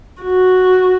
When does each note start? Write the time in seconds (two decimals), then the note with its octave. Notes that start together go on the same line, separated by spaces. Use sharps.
0.22 F#4